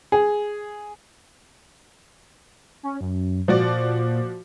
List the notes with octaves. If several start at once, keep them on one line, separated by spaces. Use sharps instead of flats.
G#4
C#4
F#2
A#2 F3 F#4 D5